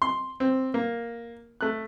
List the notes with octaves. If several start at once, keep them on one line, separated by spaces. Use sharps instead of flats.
C6
C4
A#3
A3 F#6